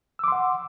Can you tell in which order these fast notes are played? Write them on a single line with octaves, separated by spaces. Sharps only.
E6 D6 C6 F#5